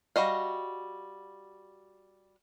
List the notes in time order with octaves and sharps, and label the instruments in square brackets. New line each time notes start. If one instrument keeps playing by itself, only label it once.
[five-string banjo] G3 F#4 D#5 F5